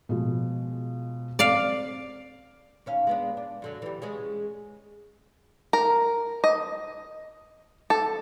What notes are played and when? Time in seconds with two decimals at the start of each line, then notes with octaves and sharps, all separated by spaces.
0.09 B2 F3 G#3
1.39 C4 D5 F5
2.86 D#2 C#4 F5
3.07 G#3 B3 D4
3.37 D4
3.62 F#2 D3 F#3
3.82 E3 G3
4.02 G#3 C#4 G#4
5.73 A#4
6.44 D#5
7.90 A4